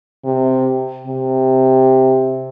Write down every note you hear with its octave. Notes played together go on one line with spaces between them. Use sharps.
C3
C3